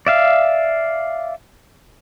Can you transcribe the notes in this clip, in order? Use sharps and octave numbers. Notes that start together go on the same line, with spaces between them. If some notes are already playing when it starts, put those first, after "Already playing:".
D5 E5 F5